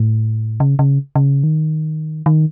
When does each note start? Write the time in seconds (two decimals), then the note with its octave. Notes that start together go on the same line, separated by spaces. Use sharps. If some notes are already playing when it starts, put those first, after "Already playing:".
Already playing: A2
0.60 C#3
0.79 C#3
1.16 C#3
1.44 D#3
2.26 D#3